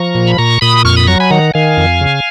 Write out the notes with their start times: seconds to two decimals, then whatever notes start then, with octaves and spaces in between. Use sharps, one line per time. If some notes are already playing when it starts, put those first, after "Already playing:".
Already playing: F3 A#5 C#6
0.15 A#2
0.27 B5
0.38 A#2 A#5 C#6
0.61 A#2 B5 D#6
0.85 F2 C#6 F6
0.96 B5 D#6
1.07 F#3 A#5 C#6
1.20 G#5 B5
1.31 D#3 F#5 A#5
1.54 D#3 F5 G#5
1.77 F2
2.01 C#3